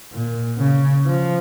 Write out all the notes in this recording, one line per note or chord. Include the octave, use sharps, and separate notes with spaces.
A#2
C#3
F3